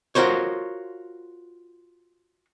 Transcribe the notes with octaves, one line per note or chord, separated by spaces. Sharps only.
F4 F#4 A#4 C5 C#5